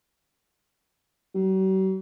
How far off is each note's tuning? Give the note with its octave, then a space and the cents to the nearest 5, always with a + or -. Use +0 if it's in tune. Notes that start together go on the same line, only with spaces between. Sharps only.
F#3 +45